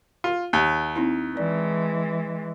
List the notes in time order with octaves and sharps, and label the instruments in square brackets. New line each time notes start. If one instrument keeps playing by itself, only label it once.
[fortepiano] F4
D#2
[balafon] C4 D#4 E4
[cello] E3 G#3 [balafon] D5